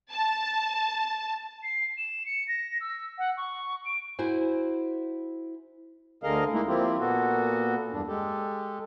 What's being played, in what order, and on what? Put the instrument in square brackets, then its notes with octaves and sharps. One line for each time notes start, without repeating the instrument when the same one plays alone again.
[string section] A5
[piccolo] C7
E7
C#7
A#6
E6
F#5
C#6
D7
[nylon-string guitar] E4 F#4 C5 G#5
[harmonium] D2 D3 G#4 A#4 D#5 F5
G#3 A#3 D#4 E4
F3 A#3 C4 E4 F4 G4
A#2 A#3 B3 F#4 A4
E2 G2 D4
G#3 G4 A4